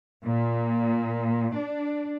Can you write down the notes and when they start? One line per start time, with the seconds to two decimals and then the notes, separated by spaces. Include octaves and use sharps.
0.24 A#2
1.55 D4